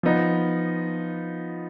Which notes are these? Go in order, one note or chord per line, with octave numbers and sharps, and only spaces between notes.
F3 B3 D#4